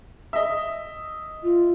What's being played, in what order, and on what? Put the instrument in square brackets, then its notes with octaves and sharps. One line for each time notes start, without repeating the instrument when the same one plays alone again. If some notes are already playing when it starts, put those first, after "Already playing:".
[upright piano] D#5 E5
[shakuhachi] F4